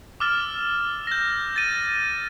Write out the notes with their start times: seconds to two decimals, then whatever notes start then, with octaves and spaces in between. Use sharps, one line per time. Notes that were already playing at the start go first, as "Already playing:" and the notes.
0.20 D6 E6 F6 A6 E7
1.07 G6 A#6
1.56 A6 D#7